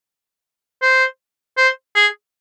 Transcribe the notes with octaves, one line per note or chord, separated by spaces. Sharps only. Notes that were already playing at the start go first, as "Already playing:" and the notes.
C5
C5
G#4